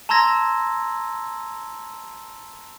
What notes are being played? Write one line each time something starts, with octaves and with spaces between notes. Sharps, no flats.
A5 A#5 C6 E6 G#6 A#6